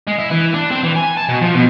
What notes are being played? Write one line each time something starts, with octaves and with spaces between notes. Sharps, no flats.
G#3
E4
E3
D4
C4
E3
G#5
A5
B2
F3
B2